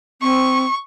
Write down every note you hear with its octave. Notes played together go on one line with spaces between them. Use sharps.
C4 C#6